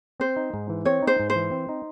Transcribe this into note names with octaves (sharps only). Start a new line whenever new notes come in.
C4 C5
D#4
G#2
E3
C4 C#5
D#4
C5
G#2
C5
E3
C4
D#4